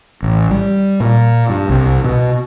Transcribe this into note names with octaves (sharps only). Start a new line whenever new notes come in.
A1
G3
A#2
G2
C2
B2